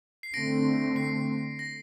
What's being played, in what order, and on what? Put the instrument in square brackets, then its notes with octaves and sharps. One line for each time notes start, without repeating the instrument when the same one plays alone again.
[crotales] C7
[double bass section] D3 A3 C4 [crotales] A#6 D7
[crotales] C7
A#6